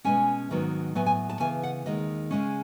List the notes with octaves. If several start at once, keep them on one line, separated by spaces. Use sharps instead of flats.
B2 G#3 C#4 G#5
G#2 D#3 F#3 B3
A2 F#3 B3 G#5
G#5
A5
C#3 E3 B3 G#5
F#5
D#2 D#3 G#3 D#5
C#3 E3 G#3 C#4